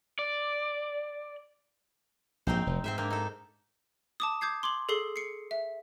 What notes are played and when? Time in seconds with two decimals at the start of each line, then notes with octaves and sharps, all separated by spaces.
0.19 D5
2.47 A#1 G#2 C4 D#4 C5
2.67 F1
2.84 G#2 C4 C5 E5
2.98 A#3 C4 D4
3.10 D#4 A4
4.20 A5 D6 D#6
4.41 D6 D#6 G6 G#6 C7
4.63 C6 D6 G#6 F#7
4.89 G#4 A4 D#6 C7 G7
5.16 C7 C#7
5.51 E5